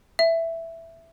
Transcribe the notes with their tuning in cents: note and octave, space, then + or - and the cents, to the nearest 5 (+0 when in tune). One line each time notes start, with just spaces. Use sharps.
E5 +5